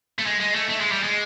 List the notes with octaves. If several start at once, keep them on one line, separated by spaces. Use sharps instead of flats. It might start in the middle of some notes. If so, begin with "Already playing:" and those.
A3
G#3
G#3
A3
A3
G#3
G3
G#3